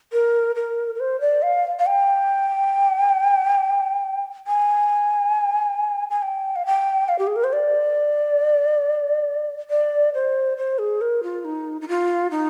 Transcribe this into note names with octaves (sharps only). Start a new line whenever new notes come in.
A#4
A#4
A#4
C5
D5
F5
F5
G5
G#5
G#5
G5
F5
G5
F5
G4
G#4
A#4
C5
D5
D5
C5
C5
G#4
A#4
F4
D#4
D#4
F4
D#4